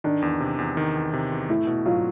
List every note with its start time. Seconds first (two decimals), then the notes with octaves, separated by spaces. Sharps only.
0.04 D#3 D4
0.22 E2
0.40 C3
0.59 E2
0.77 D#3
0.96 E2
1.14 C3
1.32 E2
1.49 A3 E4
1.67 B2
1.86 F#3 F4